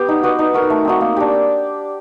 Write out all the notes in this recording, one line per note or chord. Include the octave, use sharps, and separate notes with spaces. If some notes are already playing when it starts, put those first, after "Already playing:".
Already playing: B3 G4
D#4
F#4 B4 D#5
D#4
F#4 A#4
A3
C4 D#4 F#4
A#3
D4 G4